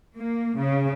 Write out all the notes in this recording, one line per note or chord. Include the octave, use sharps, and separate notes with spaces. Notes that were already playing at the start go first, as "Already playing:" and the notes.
A#3
C#3